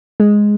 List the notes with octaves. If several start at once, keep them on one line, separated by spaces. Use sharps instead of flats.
G#3